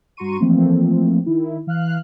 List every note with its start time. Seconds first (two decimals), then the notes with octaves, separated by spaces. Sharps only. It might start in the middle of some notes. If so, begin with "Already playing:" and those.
0.17 G2 F#4 A#5 C6 C#6 D#7
0.40 E3 F3 A3 A#3 C4
1.26 D#3 E4
1.67 E3 F5 F6 F#6